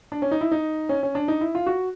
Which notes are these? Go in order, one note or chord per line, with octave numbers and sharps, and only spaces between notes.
D4
C#4
D#4
E4
D#4
C#4
C#4
D4
D#4
E4
F4
F#4